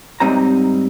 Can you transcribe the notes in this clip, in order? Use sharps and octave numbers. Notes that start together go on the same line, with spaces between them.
G#2 G3 C4 D#4 A#5